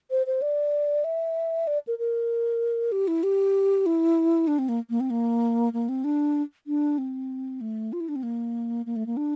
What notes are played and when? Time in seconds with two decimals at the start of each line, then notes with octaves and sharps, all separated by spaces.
0.11 C5
0.27 C5
0.42 D5
1.04 E5
1.67 D5
1.87 A#4
1.98 A#4
2.92 G4
3.08 E4
3.23 G4
3.86 E4
4.47 D4
4.59 C4
4.69 A#3
4.90 A#3
5.00 C4
5.10 A#3
5.73 A#3
5.89 C4
6.04 D4
6.67 D4
6.98 C4
7.61 A3
7.93 F4
8.00 E4
8.09 D4
8.16 C4
8.23 A#3
8.86 A#3
8.96 A3
9.06 A#3
9.17 D4